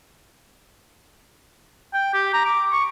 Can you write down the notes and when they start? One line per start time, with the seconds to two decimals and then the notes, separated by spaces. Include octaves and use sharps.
1.94 G5
2.14 G4
2.34 A#5
2.46 D6
2.72 C#6